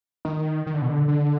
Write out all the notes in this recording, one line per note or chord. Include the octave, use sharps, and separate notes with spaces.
D#3
D#3
D3
B2
D3
D3